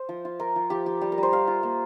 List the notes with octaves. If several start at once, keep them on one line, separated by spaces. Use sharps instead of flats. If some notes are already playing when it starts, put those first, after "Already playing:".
Already playing: C5
F3
F4
F4 A#4
F3
F3 G4
F3 G4
G3 G4
A#4
G3
C5
G3 F5
F4
A#3